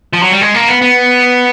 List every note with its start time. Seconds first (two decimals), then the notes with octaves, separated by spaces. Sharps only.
0.13 F3
0.22 F#3
0.32 G3
0.41 G#3
0.54 A#3
0.68 B3
0.82 B3